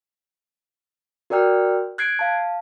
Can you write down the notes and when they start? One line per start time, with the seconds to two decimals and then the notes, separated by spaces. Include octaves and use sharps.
1.30 F#4 A#4 D5 G5 F6
1.98 F#6 G#6 C7 D7
2.19 F5 A5